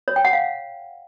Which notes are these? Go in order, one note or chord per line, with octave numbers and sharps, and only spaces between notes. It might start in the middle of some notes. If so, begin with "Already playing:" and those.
C#5
G5
F#5
F5